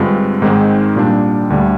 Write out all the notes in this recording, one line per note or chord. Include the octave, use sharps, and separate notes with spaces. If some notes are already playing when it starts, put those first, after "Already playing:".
Already playing: G2 D3 G#3 C4 F4
G#2 D#3 G#3 C4
A#2 G3 D4
D2 D3 G3